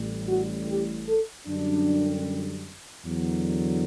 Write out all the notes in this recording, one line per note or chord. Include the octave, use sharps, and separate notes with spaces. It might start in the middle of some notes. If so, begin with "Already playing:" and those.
Already playing: A1 A2 G3
F#4
G4
A4
F#2 D3 G3 D4
E2 D3 F#3